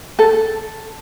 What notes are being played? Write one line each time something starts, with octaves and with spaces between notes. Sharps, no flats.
A4